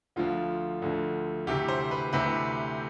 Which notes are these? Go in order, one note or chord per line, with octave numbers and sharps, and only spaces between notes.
D2 D3 F3 F4
D2 D3 F3
D2 C3 E3 G4
C5
B4
D2 C3 E3 B4